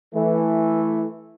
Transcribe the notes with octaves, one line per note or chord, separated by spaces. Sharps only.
E3 A3